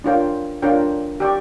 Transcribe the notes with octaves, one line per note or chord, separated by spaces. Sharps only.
D4 F4 A#4 C#5 G5
D4 F4 A#4 C#5 G5
G4 D5 G5 C#6